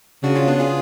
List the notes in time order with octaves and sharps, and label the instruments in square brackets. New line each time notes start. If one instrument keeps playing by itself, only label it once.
[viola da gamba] C#3 [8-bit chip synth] D4 F#4
[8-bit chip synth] C#4 F4
B3 D4
F4 G#4